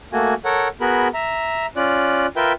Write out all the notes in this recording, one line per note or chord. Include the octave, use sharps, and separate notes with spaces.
A3 A#3 F#4 G#5
A4 A#4 C#5 F#5
B3 F#4 G#4 A#4 B5
E5 A#5
C#4 F4 D5 F#6
F4 A#4 B4 E5 G5